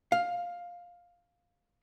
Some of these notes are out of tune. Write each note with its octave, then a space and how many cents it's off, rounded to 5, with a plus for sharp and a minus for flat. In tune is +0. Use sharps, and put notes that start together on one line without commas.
F5 +10